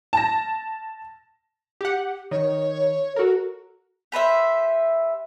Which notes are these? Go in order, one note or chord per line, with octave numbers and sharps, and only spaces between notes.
A5 A#6
G4 F#5
D#3 C#5
F#4 A4 A#4
G4 B4 C5 E5